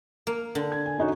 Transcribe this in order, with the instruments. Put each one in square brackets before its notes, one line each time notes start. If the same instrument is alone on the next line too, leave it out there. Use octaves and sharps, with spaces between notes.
[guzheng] A#3
D3
[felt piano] G#6
G#5
C#4 D#4 F#4